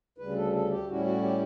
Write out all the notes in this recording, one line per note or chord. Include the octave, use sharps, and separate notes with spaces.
D2 C#3 G3 B4
A4
A4
G4
A2 G3 C#4 E4 F#4
F#4
G4